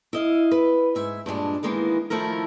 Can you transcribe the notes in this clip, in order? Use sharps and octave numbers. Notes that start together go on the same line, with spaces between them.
E4 D#5 F5
B4
G#2 E5 G#5
G2 A#2 G#3 D4
D#3 E3 G#3 A#3 B3
D#3 F3 A3 E4 A#4